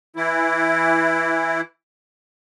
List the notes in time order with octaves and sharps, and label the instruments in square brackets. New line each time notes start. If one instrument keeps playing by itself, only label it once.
[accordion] E3 E4